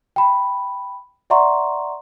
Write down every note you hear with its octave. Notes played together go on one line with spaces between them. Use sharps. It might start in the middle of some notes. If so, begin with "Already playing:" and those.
G5 B5
D5 E5 F#5 A#5 C6 C#6